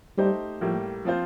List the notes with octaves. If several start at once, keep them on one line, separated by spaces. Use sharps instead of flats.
G3 A3 D#4 G4 C5
A2 F3 G3 A#3
F3 C4 F4 C5